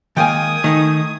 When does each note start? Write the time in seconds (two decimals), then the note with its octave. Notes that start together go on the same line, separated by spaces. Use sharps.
0.17 D#3 G#3 A#3 G5 G#5 D#6 G#6
0.64 D#3 A3 D#4 D#5